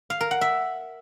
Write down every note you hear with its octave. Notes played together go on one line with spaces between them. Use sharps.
F5
A#4
F#5
E5